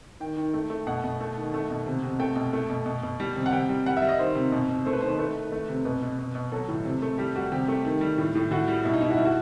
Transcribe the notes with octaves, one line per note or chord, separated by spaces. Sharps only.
D#3 G5
D#3
A3
A3
B2 F#5
B2
A3
D#3
A3
B2
C3
C3
A3 G5
B2
A3
B2
B2
B2
G3
C3
F#5
C3 G5
G3
G3 F#5
E5
G3
D#5
D#3 C5
C3
B2
B2
A3 C5
B4
D#3 C5
A3 B4
D#3
A3
C3
B2 B4
B2
B2
B2
F#3 A4
A2
C3
A3
G3 G4
G3 F#4
C3 G4
A3
D#3
G3
A2
A2
A2 F#4
G3
B2 E4
D#4
B2 E4
F#4
G3 E4
F#4